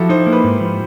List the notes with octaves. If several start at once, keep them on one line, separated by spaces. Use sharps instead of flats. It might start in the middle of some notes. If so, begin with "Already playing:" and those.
Already playing: F3 E4 F#4 G4 A4
D#4 C5
A#3
B4
G#2
F3